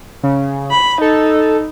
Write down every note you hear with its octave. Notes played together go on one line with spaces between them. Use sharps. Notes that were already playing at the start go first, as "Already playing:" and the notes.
C#3
B5
D#4 A4